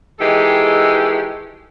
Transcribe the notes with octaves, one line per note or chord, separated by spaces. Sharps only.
D#3 E3 G#3 G4 A4